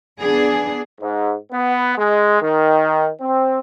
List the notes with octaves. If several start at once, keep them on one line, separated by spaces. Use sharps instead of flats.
B3 D4 G#4
G#2
B3
G#3
D#3
C4